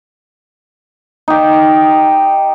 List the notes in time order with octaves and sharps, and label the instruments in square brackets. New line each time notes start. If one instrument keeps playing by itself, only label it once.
[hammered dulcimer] D#4 G4